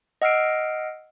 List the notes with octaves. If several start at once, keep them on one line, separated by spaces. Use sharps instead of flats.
D#5 F#5 E6 F6 C7 D7